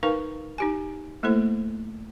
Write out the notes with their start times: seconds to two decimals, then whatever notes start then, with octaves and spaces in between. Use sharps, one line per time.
0.03 D#4 A#4 B4 F5 C#6
0.58 D#4 G4 G#5
1.23 A3 A#3 E4 A4 C5